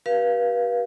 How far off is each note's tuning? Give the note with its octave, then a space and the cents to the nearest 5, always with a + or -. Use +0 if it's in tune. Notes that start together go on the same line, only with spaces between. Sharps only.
G4 -35 B4 -35 F5 -10